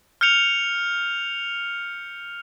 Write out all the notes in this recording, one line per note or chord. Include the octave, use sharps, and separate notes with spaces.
F6 G6 C#7 F7